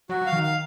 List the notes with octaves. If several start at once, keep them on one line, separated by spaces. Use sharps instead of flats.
F#3 F#4
F#3 F5
D#3
F5